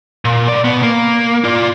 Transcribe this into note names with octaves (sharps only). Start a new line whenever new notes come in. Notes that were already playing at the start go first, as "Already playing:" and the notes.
A#2
C2 D5
B2 B3
A#3
F4 D5